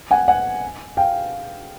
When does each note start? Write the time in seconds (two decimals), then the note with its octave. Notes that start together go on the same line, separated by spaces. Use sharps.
0.11 F#5 G#5
0.28 F#5 G#5
0.97 F5 G5